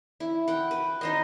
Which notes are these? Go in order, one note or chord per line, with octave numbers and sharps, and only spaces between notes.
E4
F#5 G5
B4
D#4 C5 D#5